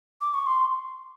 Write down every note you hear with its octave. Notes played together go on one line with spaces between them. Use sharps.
D6
C#6
C6